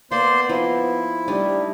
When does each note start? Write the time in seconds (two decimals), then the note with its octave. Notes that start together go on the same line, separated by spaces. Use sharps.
0.11 A#3 B3 C5 D5 C6
0.49 F3 D#4 E4
1.28 G3 A3 D4 D#4